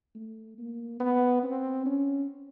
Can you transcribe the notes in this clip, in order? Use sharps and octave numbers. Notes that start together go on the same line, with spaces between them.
A3
A#3
B3
C4
C#4